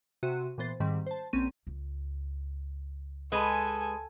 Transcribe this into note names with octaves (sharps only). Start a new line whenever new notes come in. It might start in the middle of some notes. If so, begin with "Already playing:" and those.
C3 F#4 E5 C6 D#7
A#2 E3 B3 C5 A6
G#2 D#3 G3 C4
C5 A5
A#1 A#3 C4 C#4 D#7
C#2
G#3 A4 B4 G#5